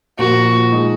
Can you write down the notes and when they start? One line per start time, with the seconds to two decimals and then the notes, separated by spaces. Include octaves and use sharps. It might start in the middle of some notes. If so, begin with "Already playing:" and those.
0.19 A#2 F3 A#3 F#4
0.72 D#3 G#3 D#4